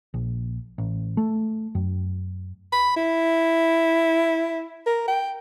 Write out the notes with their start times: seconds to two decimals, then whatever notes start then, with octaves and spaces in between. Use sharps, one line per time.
0.14 A#1
0.78 A1
1.17 A3
1.75 F#2
2.73 B5
2.96 E4
4.86 A#4
5.08 G5